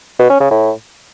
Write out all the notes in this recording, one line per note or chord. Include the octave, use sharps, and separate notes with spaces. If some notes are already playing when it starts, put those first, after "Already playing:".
B2
C#4
C#3
A2